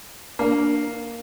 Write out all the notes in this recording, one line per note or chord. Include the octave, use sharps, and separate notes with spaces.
A#3 D4